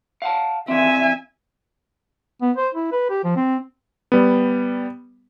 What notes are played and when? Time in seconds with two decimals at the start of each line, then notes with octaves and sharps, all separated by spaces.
0.22 F5 F#5 A5
0.68 E3 C4 E5 G#5
2.42 B3
2.57 C5
2.75 E4
2.92 B4
3.10 G4
3.24 F3
3.36 C4
4.12 G3 B3